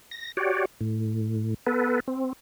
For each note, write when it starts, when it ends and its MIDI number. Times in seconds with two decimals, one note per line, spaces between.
0.11 0.32 94
0.37 0.65 66
0.37 0.65 67
0.37 0.65 73
0.37 0.65 74
0.81 1.54 45
1.67 2.00 59
1.67 2.00 69
1.67 2.00 71
2.08 2.33 60